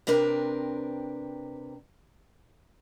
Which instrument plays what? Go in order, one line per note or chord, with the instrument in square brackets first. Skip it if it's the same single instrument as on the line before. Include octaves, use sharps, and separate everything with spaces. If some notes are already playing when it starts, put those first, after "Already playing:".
[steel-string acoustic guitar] C3 C4 D4 A#4 B4